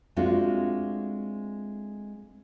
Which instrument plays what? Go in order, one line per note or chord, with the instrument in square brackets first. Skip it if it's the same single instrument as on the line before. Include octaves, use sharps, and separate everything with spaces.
[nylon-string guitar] G#3 A3 C4 D4 F4 F#4